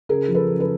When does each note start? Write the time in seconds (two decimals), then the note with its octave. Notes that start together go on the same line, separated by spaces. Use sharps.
0.09 C#3 G#4 A#4
0.28 F3
0.35 A4 B4
0.47 C#3
0.60 A4 B4